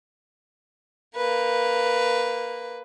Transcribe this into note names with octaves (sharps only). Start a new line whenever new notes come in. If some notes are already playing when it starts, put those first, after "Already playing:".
A#3 B4